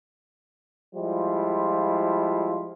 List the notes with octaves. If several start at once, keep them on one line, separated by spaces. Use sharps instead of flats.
F3 G3 G#3 E4 F4